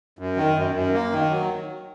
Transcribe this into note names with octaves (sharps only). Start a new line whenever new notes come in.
F#2
D#3
F#2
F#2
A#3
D#3
F#3